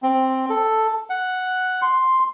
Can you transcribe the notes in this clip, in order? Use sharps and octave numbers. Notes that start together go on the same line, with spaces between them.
C4
A4
F#5
C6